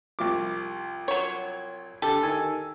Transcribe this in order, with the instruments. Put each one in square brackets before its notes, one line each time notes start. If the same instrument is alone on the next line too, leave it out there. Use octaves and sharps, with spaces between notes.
[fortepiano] C2 F3 D6
[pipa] F#3 C#5
[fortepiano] D3 G4 [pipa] A4
[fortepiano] D#3 G#5 E6